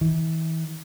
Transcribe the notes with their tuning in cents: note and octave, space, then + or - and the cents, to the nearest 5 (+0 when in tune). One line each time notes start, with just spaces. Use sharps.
E3 -35